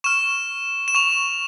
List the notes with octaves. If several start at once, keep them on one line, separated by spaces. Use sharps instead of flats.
C#6 F6 E7
E7
C#6 F7